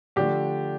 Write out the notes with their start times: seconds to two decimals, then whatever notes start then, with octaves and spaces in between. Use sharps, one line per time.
0.16 D3 F3 A3 D4 G4